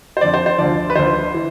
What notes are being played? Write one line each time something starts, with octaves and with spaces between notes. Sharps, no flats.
C5
F2 D3 F3 D5
C5
C5
D2 D3 F3 D5
B4
D2 D3 F3 C5
E3